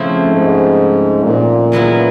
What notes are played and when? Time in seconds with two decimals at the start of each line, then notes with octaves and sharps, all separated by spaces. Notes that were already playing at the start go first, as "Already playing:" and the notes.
Already playing: C#3 F3 A3 C4 E4
0.28 G#2
1.24 A#2
1.72 C#3 F#3 B3 E4